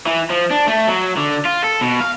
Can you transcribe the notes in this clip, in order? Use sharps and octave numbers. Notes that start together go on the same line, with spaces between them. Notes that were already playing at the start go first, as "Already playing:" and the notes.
E3
F3
D4
A3
F#3
D3
F4
A4
B2
F5